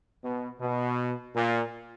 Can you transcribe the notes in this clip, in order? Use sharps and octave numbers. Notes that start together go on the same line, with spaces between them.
B2
B2
A#2